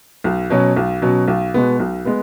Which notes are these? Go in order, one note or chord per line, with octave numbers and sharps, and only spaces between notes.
B1
B2 F#3 C#4
B1
B2 F#3 C#4
B1
B2 G#3 B3
B1
G#3 B3